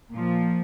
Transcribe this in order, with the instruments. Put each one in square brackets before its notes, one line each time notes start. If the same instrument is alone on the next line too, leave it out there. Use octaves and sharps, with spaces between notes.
[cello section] A#2 F3